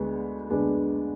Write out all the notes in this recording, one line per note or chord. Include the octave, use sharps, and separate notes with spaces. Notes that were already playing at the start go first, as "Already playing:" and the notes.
Already playing: D2 D3 G#3 B3 D4
D2 D3 G#3 B3 D4